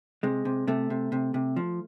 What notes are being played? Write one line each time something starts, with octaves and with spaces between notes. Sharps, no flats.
C3 G#3
C3
C3 A3
C3
C3
C3
F3